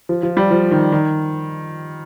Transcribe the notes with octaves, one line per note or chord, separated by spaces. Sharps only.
F3
F3
G3
F3
D#3
D#3